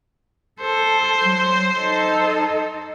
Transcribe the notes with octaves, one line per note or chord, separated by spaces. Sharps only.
A4 C5
F#3
D#4 A4